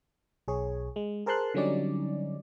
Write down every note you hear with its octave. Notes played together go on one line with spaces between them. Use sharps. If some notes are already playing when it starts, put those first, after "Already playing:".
B1 G#4 C#5
G#3
G#4 A#4 C5 A5 C6 F#6
D3 F#3 G3 C#4 D#4 D5